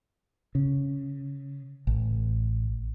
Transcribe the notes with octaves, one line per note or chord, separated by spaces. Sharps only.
C#3
A1